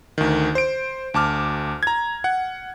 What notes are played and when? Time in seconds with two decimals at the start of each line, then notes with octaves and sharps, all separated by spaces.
0.18 D2 D#3
0.55 C5 D7
1.14 D2 A5 D6 F6
1.83 A#5 G#6
2.24 F#5